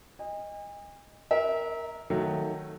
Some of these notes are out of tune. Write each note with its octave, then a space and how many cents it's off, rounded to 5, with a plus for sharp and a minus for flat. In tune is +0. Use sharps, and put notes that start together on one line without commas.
D#5 +0 G#5 -40
A#4 +0 E5 -25
D#3 +0 F#3 +0 A3 +15